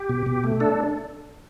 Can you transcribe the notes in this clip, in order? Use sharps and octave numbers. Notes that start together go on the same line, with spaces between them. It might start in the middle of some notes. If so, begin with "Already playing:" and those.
Already playing: G4
B2
B2
A3
D4 A4